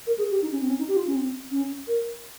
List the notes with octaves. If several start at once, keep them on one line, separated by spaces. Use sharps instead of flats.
A#4
G#4
G4
D#4
C#4
C4
C#4
D#4
G4
F4
C#4
C4
C#4
A#4